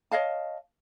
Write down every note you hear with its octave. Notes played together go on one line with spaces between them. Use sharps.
C#5 D#5 F5 A5